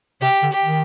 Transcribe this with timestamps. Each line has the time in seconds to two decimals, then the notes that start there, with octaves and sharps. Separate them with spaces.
0.22 C3 G4
0.43 D3
0.53 G4
0.63 D#3